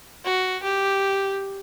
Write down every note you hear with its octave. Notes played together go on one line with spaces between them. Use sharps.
F#4
G4